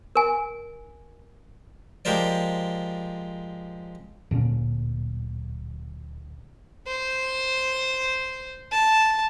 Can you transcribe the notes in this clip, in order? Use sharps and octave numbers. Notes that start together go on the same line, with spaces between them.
A#4 G#5
F3 G#3 G4 A#4 C5 D5
D1 A#2 D3 C#4
C5
A5